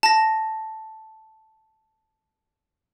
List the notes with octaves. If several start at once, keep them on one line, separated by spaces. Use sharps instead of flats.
A5 A#6